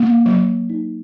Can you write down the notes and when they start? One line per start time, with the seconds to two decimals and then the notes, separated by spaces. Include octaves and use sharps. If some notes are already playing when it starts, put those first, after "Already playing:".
Already playing: A#3
0.26 F#3
0.70 D#4